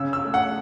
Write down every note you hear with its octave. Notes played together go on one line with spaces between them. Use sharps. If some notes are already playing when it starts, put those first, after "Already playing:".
Already playing: C#3 E6
E6
A3
F#5